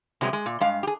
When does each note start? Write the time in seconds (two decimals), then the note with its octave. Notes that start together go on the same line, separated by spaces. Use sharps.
0.21 C3 F#3 G#3 B3
0.33 G#3
0.46 A#2
0.60 G2 G#3 F5
0.83 G4 G#4